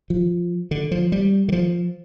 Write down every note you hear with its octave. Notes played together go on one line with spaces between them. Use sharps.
F3
D3
F3
G3
D3
F3